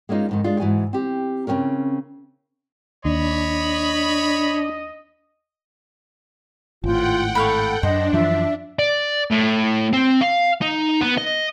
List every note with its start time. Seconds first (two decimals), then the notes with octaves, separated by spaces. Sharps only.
0.09 G#3 A#3 C#4 D#4 F4
0.29 F2 G#2 D#3
0.44 G#3 D4 F4
0.60 G#2 E3 F#4 G#5
0.93 C4 G4
1.47 C#3 F#3 C4 C#4 A#4
3.05 D#2 D4 C#5 D#5 B5
6.84 G#1 A2 F4 F#5 G5
7.35 A4 C#5 F5 B5
7.83 F#2 D4 C5 D#5
8.13 F#2 E3 F3 E5
8.79 D5
9.31 A2
9.93 C4
10.21 F5
10.61 D#4
11.01 B3
11.17 D#5